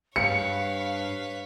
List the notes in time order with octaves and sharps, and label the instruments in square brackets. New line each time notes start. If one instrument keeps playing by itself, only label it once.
[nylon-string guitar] G2 [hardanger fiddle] B4 C#5 [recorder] F5 [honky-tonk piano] C#7